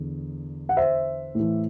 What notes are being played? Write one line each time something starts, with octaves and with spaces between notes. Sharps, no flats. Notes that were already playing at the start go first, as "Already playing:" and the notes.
Already playing: E2 D3
F#5
C5 E5
A2 E3